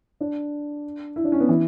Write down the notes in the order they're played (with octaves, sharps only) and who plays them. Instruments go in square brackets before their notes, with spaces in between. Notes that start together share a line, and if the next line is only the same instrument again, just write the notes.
[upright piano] D4
E4
D4
C#4
B3
E3